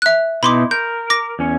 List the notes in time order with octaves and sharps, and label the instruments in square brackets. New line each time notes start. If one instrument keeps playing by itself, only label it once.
[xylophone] E5 F#6
[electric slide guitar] B2 D#4 E4 [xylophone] B5 C6 D6
[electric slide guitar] A#4 [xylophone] G6
[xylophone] D6 A#6
[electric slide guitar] E2 C#4 C#5